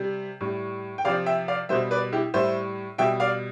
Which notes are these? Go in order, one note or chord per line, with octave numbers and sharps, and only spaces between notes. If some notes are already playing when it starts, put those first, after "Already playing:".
Already playing: C3 G3
A2 G3
G5
C3 F3 D5 F5
E5 G5
D5 F5
B2 G3 C5 E5
B4 D5
E4 G4
A2 G3 C5 E5
B2 G3 E5 G5
D5 F5